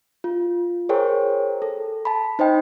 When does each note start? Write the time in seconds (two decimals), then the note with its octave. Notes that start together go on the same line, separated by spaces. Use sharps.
0.24 F4
0.89 G#4 A#4 C5 C#5 G5
1.62 A4
2.05 A5 B5
2.39 D#4 C5 D#5 G5